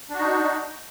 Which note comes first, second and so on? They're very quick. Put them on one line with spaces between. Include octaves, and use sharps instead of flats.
D4 F#4 D#4